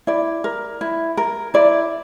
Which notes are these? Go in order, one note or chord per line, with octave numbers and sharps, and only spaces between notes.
E4 D5
A#4
E4
A#4
E4 D5